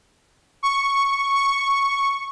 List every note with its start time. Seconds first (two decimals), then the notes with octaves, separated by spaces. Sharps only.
0.63 C#6
1.38 C#6